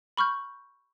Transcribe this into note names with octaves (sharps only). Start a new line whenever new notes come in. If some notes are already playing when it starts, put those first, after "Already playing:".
B5 C#6 F6 G6